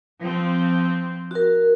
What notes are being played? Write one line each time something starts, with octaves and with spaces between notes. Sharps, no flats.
F3 C4
F#4 A#4